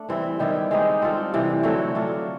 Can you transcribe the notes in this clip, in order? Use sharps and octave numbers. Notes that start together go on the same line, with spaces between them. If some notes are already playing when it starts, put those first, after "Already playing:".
Already playing: A3 D4
E3 G3 C4 E4
D#3 G3 B3 E4
G#3 C4 D#4 G4
G3 C4 F4 A4
C3 E3 G3
D3 F#3 A3 C4
F#3 A3 D4 F4